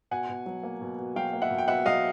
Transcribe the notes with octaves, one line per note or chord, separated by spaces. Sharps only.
B2 F#5 G#5
B2
F#3
A#3
B2
B2
F#3 F5 G5
A#3
E5 F#5
B2
G5
B2 E5 F#5
F#3 D#5 F5